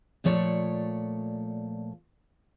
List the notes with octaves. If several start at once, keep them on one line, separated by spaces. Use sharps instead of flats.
A#2 F3 A3 C#5 D5